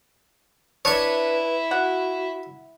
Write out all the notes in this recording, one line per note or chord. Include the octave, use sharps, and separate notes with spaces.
D4 E4 B4 C#5 E5 C#6
F#4 F#5